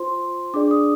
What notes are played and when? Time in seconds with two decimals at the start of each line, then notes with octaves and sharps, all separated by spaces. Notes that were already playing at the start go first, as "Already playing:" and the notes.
Already playing: F4 C5 C6
0.54 D4 G#4 D5 D6
0.71 D#6